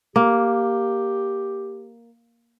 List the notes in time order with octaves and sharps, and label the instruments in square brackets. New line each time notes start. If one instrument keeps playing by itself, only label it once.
[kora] A#3 [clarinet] G4